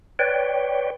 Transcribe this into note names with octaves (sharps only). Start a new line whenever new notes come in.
B4 C#5 D5 G5